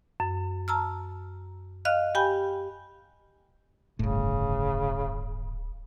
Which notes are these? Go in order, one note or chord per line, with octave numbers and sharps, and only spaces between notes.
F#2
A5 A#5 E6 F6
D#5 F5 F6 F#6
G4 G5 G#5 B5 G6
D1 G1 A2 C#3